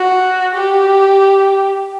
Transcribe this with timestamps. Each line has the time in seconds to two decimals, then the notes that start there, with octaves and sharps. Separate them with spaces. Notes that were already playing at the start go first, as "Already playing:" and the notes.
Already playing: F#4
0.55 G4